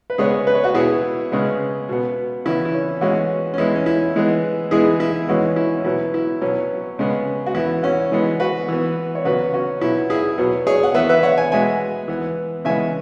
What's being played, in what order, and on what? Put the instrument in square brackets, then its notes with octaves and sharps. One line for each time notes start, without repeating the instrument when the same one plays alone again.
[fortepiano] B4
C#3 G#3 B3 G#4 C#5
B4
C#5
F#4 B4
B2 B3 E4 G#4
C#3 G#3 B3
B2 B3
C#3 E3 B3 E4
E4
C#4
E3 G#3 B3 C#4 F#4
C#4
E3 G#3 B3 E4
C#4
E4
E3 G#3 B3
E3 G#3 B3 E4 G#4
E4
E3 G#3 B3 C#4 F#4
E4
C#4
B2 F#3 B3 E4
E4
B2 F#3 B3 C#4
C#3 G#3 B3
F#4
E3 B3 E4
C#4 F#4
E3 G#3 B3
F#4 B4
E3 B3
C#5
C#3 F#3 B3 F#4 B4
C#4 F#4
B2 F#3 B3 E4
E4 G#4
B2 F#3 B3
G#4 C#5
F#5
E3 B3 B4 E5
B4 E5
C#5 F#5
G#5
B2 G#3 B3 E5 G#5
E3 B3
C#3 E3 G#3 B3 E5 G#5